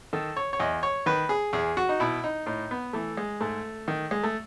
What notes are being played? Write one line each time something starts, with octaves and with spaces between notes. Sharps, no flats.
D#3 A4
C#5
C#5
E2 D#5
C#5
D#3 B4
G#4
E2 G#4
F#4
D#4
B2 E4
D#4
A2 D#4
B3
E3 A3
G#3
G#2 A3
D#3
G#3
A3